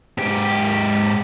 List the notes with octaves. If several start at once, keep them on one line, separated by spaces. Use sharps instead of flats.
G#2 G4